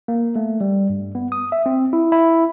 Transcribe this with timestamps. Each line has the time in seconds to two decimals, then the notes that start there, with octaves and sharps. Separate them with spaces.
0.08 A#3
0.36 A3
0.61 G3
0.89 G2
1.15 B3
1.32 D#6
1.52 E5
1.66 C4
1.93 E4
2.12 E4